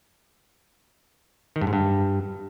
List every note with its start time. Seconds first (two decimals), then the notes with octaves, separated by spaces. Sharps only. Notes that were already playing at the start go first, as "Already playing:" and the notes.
1.56 D#3
1.61 G2
1.67 G#2
1.73 G2